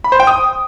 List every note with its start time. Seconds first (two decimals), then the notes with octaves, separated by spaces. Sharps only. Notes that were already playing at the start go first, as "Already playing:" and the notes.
0.04 B5
0.12 C5
0.20 G5
0.27 D#6